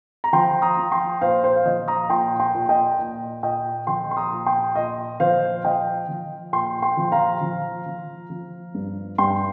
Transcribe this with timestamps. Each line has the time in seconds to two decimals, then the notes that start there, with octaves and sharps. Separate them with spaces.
0.24 A#5
0.33 F3 G5 C6
0.62 A#5 D#6
0.77 F3
0.92 G5 C6
1.21 A#2 C5 F5
1.44 C5
1.56 F5
1.65 F3 D#5
1.88 A#5 D#6
2.10 A#2 G5 C6
2.39 G5 C6
2.54 A#2
2.69 D#5 G5
2.99 A#2
3.43 A#2 D#5 G5
3.87 F3 G5 C6
4.11 C6
4.17 A#5 D#6
4.32 A#2
4.46 G5 C6
4.75 A#2 D#5
5.20 F3 C5 F5
5.64 F3 D#5 G5
6.09 F3
6.53 A#2 G5 C6
6.82 G5 C6
6.97 F3
7.12 F5 A#5
7.41 F3
7.86 F3
8.30 F3
8.75 G2
9.18 G2 G5 C6